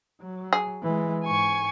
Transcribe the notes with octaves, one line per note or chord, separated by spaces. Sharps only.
F#3
G#4
E3 G#3
G#2 G#5 C#6